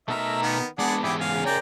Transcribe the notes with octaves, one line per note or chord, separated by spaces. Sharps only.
B2 A3 D#4 A#4 E5 A#5
D#3 B3
G#3 B3 D4 G#4 D5 F#5
E2 G#2 E4 G4 G#4 D6
C#3 F5 G#5
A#4 C#5 D5 G5 A#5